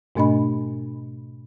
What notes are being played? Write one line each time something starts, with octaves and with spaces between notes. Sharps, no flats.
G#2 B2 A3 D4 D#5 B5